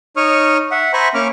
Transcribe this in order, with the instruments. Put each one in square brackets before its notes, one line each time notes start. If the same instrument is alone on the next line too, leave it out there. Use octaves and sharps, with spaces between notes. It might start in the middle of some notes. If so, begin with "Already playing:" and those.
[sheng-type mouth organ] D#4 C#5 C#6 D#6 F6
E5 F#5
C5 E5 G#5 A#5 B5 C#6
A#3 C#4 C#6 D6 F6